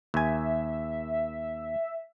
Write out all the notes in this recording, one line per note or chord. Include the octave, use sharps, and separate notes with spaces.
D#2 E5 G#5